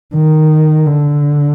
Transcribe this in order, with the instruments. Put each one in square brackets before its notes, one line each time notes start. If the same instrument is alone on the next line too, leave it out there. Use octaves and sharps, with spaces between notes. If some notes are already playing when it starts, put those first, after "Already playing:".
[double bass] D#3
D3